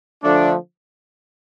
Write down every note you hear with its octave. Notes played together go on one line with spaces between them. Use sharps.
D3 F3 A3 D4